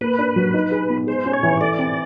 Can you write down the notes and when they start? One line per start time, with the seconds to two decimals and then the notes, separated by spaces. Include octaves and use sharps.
0.01 A#3 B4
0.18 D4
0.36 F#3
0.54 D#4
0.71 G#4
0.90 B3
1.07 G#3 C5
1.26 C#4
1.33 C#5
1.43 E3
1.61 A3 D5
1.79 C4